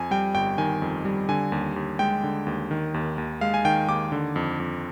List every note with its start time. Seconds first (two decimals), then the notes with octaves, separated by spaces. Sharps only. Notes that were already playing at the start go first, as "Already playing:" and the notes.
Already playing: F2 G#5
0.11 G3 G5
0.34 G1 G5
0.58 D#3 G#5
0.82 F2
1.05 G3
1.29 D3 G#5
1.52 D#2
1.76 D#2
1.99 G#3 G5
2.24 D3
2.47 D#2
2.71 D#3
2.94 D#2
3.18 D#2
3.41 G#3 F5
3.54 G#5
3.65 D#3 G5
3.88 D#2 D6
4.12 D3
4.36 F2
4.60 F2